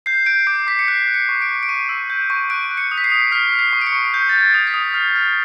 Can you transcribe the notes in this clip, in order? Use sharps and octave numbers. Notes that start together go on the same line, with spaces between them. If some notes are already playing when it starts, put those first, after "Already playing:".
G6 C7
G6 D7
D6 C7
D6 B6
C#7
F#6 C7
F#6
C#7
C#6
D7
C#6
D7
C#6 D#7
E6
G6
C#6
F#6 D7
F#6
C#7
D#6
B6
C7
D#6
F6 B6
F6
C7
C#6
D7
C#7
C#6
G6
G6 A6
G#6
D#6
B6
D#6
F6 C7
F6